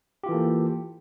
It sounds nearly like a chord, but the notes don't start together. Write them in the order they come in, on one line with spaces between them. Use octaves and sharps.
G4 F4 E3 A4 A#3